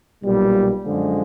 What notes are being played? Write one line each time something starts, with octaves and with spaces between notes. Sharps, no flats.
B1 A#2 G3
F#2 D3 F3 G#3